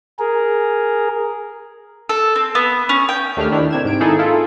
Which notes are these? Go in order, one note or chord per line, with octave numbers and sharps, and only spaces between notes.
G#4 A#4
A4
C4
B3
C#4
G5
D#2 A3 D4 G4 F6
D#3 D4 E4
C3 G#6 E7
G#2 D7
D#3 A#3 D#4 E4 G#4 A4
E4 F4 A4